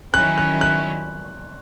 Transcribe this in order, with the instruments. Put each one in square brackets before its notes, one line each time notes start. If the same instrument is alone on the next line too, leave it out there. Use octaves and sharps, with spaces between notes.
[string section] D#3 F#3 C#4 E4 [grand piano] F#6
[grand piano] F#6
F#6